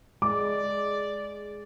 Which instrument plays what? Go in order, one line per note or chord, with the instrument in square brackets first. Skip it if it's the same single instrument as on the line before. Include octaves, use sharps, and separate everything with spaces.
[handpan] G#3 [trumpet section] D5 [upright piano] D6